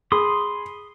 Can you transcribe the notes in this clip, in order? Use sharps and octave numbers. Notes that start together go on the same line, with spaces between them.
G#4 B5 C6 D#6